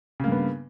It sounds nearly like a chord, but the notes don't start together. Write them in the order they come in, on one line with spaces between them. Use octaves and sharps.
C#3 A#3 G2 B3